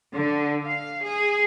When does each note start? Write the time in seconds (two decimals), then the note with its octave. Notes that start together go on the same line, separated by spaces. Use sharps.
0.13 D3
0.65 F5
1.03 G#4